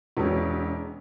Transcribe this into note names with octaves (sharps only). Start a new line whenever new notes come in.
E1 E2 B2 G#3 C#4 C#5